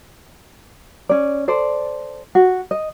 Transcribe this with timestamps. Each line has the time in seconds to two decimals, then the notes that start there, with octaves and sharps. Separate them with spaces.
1.09 C#4 D5
1.48 A4 C5 D5
2.35 F#4
2.71 D#5